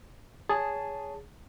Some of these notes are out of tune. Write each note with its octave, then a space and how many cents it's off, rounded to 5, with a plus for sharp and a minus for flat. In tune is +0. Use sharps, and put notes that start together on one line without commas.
G#4 +0 C#5 +20 A5 +0